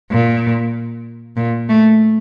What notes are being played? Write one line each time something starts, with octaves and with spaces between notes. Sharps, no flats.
A#2
A#2
A3